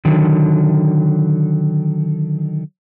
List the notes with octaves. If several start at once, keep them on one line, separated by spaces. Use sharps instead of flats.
D3 D#3 F#3